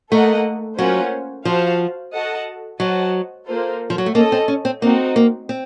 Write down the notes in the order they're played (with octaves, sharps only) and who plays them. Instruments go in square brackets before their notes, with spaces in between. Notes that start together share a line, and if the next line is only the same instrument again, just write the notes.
[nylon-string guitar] A3 [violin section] A#3 D#4 A4 D#5 F#5
[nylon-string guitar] F#3 [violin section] A#3 C#4 F4 C5 F#5
[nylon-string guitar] F3 [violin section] F#4 C5 F5 A5
[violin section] F#4 A4 D#5 F#5 A5
[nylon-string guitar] F#3 [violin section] F#4 C5 D#5 F#5 A5
[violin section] A#3 F4 A4 C5
[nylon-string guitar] F3
F#3
A3
[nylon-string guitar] A#3 [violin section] C#4 A4 D#5 A5
[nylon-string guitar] C4
C#4
C4
[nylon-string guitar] A#3 [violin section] C4 D#4 F#4
[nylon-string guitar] A#3
C4